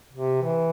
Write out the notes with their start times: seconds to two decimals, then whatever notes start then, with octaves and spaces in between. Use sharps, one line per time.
0.14 C3
0.42 E3